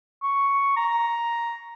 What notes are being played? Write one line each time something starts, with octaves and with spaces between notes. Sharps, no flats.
C#6
A#5